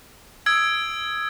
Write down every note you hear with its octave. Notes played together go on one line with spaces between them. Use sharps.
D#6 E6 G#6 D7